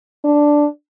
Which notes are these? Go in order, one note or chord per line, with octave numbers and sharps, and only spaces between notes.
D4